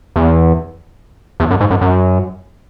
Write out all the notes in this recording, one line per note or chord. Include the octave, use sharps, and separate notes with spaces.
E2
E2
F#2
G#2
F#2
F#2